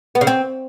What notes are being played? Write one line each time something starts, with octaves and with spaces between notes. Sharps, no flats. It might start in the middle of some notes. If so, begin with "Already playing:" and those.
B3
C#3
C4